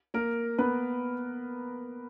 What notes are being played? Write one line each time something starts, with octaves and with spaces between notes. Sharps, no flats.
A#3 A#4
B3 B4